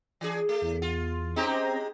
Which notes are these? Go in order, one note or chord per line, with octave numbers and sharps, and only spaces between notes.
E3 D4 G#4
A3
E2
F4
G#3 C4 C#4 D#4 G4 A#5